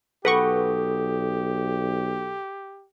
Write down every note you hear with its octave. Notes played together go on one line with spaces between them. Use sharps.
B1 G4 A4 B4 F#5 C#6